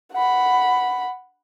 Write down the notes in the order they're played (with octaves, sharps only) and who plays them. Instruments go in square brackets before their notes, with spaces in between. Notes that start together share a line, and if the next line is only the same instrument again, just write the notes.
[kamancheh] F#5 B5